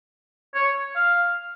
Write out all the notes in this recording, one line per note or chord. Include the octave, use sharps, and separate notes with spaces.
C#5
F5